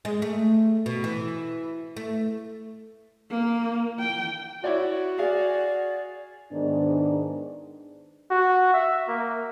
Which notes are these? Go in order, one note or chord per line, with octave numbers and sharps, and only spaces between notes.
G#3
A3
B2
E3
A3
A#3
G5
E4 F#4 C#5 D5
G#4 D5 F5 G#5
G#2 D#3 B3 D4 G#4 D5
F#4
E5
A#3